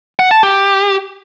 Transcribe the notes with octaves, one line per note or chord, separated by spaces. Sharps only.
F#5
A5
G4